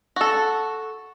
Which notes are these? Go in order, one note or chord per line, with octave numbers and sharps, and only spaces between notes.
F#4 A4